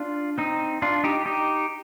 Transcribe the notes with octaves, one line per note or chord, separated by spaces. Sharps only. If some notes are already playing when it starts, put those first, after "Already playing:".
Already playing: D4 F4
C4 D#4
D4 F4
D#4 G4
D#4 G4